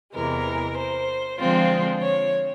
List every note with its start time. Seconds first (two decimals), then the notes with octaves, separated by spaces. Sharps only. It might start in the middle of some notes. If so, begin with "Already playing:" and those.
0.14 E2 C3 E3 G#3 A#4
0.77 C5
1.40 D3 F3 G#3 C4 F4
2.03 C#5